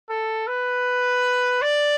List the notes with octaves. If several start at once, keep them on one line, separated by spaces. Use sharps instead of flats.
A4
B4
D5